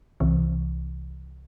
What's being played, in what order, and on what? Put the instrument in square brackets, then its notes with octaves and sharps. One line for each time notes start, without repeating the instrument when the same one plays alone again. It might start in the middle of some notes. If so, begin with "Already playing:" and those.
[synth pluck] C2 C3 E3